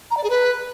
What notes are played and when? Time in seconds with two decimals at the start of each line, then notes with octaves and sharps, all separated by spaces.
0.11 A#5
0.17 D5
0.24 G#4
0.30 B4